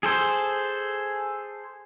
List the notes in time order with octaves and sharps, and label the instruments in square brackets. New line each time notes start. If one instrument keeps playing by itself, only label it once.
[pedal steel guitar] G#4 A4 C5